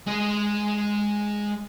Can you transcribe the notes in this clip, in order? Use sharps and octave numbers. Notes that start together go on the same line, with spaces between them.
G#3 D#5